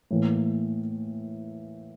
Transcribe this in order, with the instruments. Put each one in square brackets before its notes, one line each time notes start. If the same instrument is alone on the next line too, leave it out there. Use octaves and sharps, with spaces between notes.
[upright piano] A2 E3 A#3